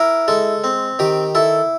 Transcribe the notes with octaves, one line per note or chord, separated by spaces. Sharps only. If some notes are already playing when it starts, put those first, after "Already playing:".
Already playing: E4 A#4
G#3 A4
C4
D#3 G4
E4 A4